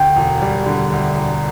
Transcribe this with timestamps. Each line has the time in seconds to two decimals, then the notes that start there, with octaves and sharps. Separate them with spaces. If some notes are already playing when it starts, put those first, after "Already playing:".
Already playing: D2 G5
0.16 E1
0.42 G3
0.66 D3
0.92 D2
1.17 E1